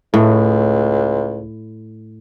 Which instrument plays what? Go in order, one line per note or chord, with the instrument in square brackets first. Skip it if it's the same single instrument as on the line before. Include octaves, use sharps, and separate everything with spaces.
[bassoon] C#2 [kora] A2